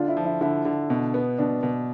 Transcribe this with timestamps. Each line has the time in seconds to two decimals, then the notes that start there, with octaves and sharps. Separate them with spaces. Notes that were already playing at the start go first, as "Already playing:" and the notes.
Already playing: D3 D4 F4
0.08 E4
0.17 F3
0.25 E4
0.41 D3 E4
0.65 D3
0.90 B2
1.14 B3
1.38 B2 D4
1.63 B2